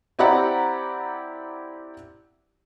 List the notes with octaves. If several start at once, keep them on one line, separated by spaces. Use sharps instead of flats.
C4 E4 G4 D5 F#5 A#5